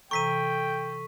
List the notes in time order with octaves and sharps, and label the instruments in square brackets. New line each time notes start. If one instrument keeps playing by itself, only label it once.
[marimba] C3 E3 A#5 [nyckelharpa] A4 [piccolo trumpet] G5 [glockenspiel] C#6 B6 D#7